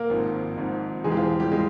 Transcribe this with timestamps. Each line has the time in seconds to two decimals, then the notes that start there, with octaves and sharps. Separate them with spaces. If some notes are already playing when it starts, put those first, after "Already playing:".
Already playing: A#3 A#4
0.09 G#1 G#2 F3
0.57 G#1 G#2 F3
1.04 E1 E2 E3 G#3 G#4
1.12 G4
1.16 F3 F4
1.40 G3 G4
1.52 G#3 G#4